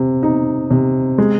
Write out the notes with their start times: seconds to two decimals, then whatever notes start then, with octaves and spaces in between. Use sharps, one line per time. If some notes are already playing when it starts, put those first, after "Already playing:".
Already playing: C3
0.23 D#4
0.71 C3
1.18 G#3